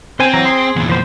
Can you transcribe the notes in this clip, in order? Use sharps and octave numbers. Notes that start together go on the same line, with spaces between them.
C4 C5 G#5
E3 F#3 A#5
G#4 C6
E2 A#2
F3 C5